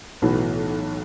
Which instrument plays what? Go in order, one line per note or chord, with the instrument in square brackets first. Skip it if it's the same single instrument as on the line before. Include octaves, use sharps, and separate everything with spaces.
[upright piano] B1 A2 E3 B3 F#4